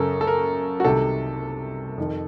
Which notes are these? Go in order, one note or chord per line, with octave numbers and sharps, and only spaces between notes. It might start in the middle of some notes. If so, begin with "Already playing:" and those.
Already playing: F#2 C#3 A4 A#4
A4
A#4
F#4
C2 C3 D#3 A4
F2 D#3